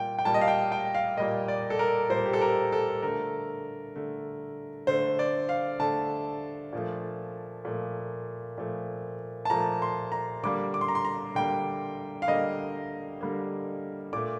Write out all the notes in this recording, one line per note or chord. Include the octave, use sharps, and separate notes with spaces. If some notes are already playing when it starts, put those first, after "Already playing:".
Already playing: A#2 G3 A#3 G5
G5
A#2 G3 A#3 A5
D#5
F5
G5
G5
F5
A#2 G3 A#3 D#5
D5
A4
A#4
A#2 G3 A#3 C5
G4
A4
A#4
A4
D3 A3 A#4
D3 A3
D3 A3 C5
D5
F5
D3 A3 A5
A#2 F3 A3
A#2 F3 A3
A#2 F3 A3
A5
A#2 F3 A3 A#5
C6
A#5
D3 G3 A#3 D6
D6
C6
A#5
C6
A#5
D3 G3 A#3 G5
F5
D3 G3 A#3 D#5
D3 G3 A#3
A#2 A3 D6